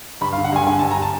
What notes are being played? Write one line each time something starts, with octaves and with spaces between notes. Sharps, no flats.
G2 B5
F5
D3
F#5
G2 G#5
D3 G#5
A5
G2
A#5
G3 A5